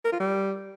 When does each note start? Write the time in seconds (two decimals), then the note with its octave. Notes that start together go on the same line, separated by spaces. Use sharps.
0.05 A#4
0.12 F4
0.19 G3